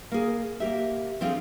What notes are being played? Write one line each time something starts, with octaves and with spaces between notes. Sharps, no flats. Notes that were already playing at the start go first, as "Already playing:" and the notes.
A#3 G#4
A#3 G4 E5
F3 C4 D4 F4 G#4 A4